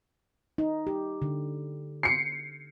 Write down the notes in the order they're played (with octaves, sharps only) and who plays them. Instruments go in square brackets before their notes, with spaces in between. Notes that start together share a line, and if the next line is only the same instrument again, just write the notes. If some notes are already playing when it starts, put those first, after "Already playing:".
[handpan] D#4
G4
D3
[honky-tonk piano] C7 C#7